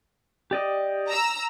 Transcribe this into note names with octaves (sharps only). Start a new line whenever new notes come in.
G4 D5 D#5
A#5 E6